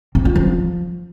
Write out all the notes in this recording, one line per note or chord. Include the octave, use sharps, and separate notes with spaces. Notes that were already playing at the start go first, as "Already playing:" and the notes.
C4
F4
F3